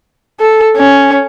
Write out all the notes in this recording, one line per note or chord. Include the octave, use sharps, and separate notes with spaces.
A4
C#4